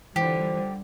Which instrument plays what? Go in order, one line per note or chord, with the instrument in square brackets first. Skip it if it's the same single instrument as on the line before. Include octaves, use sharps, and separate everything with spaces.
[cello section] D3 G3 [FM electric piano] E3 [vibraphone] F4 C5 [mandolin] G4